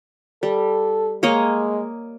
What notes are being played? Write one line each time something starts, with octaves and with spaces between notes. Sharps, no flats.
G3 A4
G#3 A#3 C#5 D#5